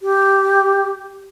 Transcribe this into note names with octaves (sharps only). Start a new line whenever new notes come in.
G4